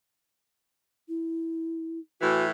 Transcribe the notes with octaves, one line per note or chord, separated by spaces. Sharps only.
E4
A2 E3 F#4